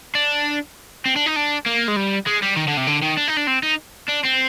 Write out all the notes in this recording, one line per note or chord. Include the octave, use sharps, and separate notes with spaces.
D4
C4
D4
D#4
D4
A#3
G#3
G3
G#3
G3
D#3
D3
C3
D3
D#3
D4
D#4
D4
C4
D#4
D4
C4